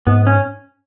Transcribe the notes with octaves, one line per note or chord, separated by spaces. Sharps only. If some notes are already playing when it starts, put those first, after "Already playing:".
G#2 B3
C#4